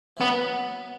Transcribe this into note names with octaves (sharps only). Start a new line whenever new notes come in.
E3
F#3 B3